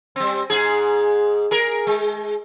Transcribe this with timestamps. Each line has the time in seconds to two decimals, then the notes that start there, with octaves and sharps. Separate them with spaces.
0.16 G3 C4
0.50 G#2 G#4
1.51 G#4 A#4
1.87 G#3